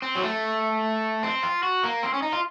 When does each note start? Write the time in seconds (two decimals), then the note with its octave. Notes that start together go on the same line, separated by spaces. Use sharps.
0.02 C4
0.15 F#3
0.23 A3
1.23 C4
1.43 F4
1.63 F#4
1.83 A#3
2.03 C4
2.14 C#4
2.22 D#4
2.32 F4